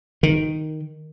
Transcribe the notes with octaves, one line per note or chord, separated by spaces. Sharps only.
D#3